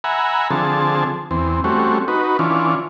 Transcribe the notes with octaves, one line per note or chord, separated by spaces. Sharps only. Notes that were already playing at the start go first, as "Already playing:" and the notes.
E5 F#5 G#5 A#5 B5
D3 F3 C4 G#4 A5
E2 C4
G3 A3 C4 C#4 F#4
D#4 F#4 B4
E3 C#4 D4 F4